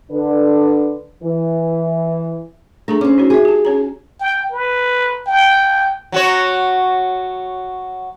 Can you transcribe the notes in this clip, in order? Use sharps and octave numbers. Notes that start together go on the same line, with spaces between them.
D3 D4 B4
E3
A3 D4 G#4 A#5
C4 C#4 D6
D#4 F#4 C#5
F#4 G#4 E5
G4 A5
C#4 C#5 A#5
G5
B4
G5
F#3 F#4 C#5